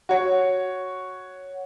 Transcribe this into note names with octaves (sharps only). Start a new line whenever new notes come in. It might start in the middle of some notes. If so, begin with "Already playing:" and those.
F#4 C#5